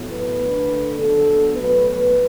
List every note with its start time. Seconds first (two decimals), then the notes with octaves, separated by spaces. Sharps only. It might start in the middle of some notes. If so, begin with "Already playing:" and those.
Already playing: A2 F#3 B3
0.12 B4
0.41 D3 A3
0.98 D3 F#3 B3 A4
1.56 B2 F#3 A3 B4